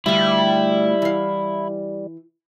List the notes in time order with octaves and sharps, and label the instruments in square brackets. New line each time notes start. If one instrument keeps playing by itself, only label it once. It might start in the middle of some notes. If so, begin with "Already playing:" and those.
[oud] D2 F4 [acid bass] G3 [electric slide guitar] E4
[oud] E3 F5